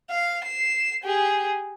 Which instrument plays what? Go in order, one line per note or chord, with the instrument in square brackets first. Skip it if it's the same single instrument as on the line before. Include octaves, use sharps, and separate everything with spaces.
[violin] F5
C7 E7
G4 G#4